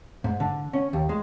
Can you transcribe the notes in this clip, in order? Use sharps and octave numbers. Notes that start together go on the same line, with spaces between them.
G#2
D3
C#4
D#2
G#3